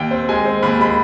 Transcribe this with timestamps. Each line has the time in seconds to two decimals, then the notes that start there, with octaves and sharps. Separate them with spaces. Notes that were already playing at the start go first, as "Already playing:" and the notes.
Already playing: D#2 G5
0.11 C4
0.29 G#3 G#5
0.45 C4
0.63 D#2 B5
0.80 G#3 B5